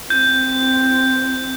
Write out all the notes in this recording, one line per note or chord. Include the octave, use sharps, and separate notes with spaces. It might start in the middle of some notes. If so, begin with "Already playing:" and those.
C4 G6